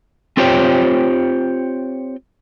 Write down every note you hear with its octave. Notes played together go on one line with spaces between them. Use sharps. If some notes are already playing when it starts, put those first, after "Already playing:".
C4 F4 G4 C5 C#5 G5